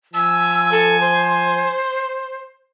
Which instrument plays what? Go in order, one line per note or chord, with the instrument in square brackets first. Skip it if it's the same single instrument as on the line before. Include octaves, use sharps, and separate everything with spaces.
[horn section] F3 G#5 [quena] E6
[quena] A4
C5